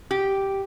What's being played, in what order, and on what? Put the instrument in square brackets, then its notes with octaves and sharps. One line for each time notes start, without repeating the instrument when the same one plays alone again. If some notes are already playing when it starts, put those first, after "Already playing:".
[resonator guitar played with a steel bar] G4